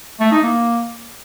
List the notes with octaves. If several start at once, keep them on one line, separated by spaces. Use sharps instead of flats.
A3
D#4
A#3